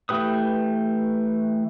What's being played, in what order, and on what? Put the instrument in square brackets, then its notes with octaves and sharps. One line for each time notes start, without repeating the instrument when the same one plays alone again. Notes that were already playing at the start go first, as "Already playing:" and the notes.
[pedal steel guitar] E3 A3 G4 B4 D#6